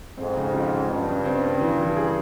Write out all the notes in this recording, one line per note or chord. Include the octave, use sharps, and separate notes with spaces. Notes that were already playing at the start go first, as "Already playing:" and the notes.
F2 G#2 C4
C#3
F3
C#3
G2 C#3
C#3
C4
C#3
E3
E3
G#4